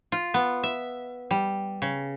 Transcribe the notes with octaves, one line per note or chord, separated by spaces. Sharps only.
F4
B3
E5
G3
C#3